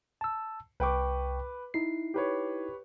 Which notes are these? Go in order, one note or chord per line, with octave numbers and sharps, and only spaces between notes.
A5 E6
C2 B4 G5 C#6 D6
D#4 E4 C7
G4 B4 C#5